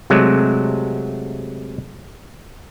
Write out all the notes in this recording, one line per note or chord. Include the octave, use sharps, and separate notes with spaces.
C3 F#3 G#3 A3